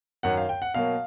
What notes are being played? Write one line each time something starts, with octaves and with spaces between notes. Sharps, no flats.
F#2 D#3 F#3 F#5
F5
G5
F#5
B2 F#3 A#3 F5